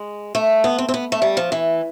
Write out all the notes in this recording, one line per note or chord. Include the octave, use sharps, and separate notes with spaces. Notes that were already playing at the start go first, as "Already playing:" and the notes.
Already playing: G#3
A3
B3
C4
C4
B3
A3
G3
F3
E3